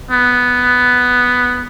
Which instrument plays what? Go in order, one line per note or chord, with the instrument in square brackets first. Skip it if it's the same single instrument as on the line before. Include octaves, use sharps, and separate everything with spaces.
[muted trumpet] B3